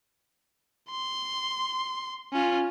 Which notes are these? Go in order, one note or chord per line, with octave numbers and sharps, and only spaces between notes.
C6
C#4 F4